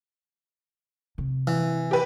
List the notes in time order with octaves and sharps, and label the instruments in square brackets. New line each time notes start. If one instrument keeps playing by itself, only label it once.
[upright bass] C3
[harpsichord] E3
[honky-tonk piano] G4 B4